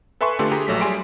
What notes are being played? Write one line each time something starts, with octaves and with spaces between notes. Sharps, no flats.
A4 B4 E5 G#5 C6 C#6
D3 A3 F4 G4 A4 B4
G4 G#4 A#5
A#1 F#3 A3 B6
G3 G#4 G#5 C6 D7